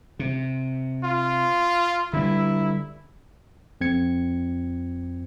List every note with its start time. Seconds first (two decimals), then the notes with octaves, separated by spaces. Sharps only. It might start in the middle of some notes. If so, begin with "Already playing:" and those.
0.19 C3
1.04 F4
2.13 D3 G3 E4
3.81 F2 C4 G#6 C#7